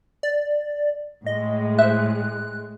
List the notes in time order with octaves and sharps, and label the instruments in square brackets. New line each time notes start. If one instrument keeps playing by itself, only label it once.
[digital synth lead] D5
[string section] A2 G#3 [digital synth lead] D#5
[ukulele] C5 E5 [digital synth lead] F#6